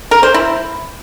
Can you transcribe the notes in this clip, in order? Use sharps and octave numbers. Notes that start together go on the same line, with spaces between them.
A#4
C5
E4